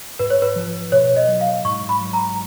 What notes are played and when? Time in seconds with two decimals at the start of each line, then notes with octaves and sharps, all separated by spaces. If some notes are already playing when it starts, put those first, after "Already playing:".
0.19 G#2 B4
0.30 C#5
0.42 B4
0.56 F3
0.92 B2 C#5
1.16 D#5
1.28 F#3
1.41 F5
1.65 G#2 C#6
1.89 B5
2.01 F#3
2.13 A#5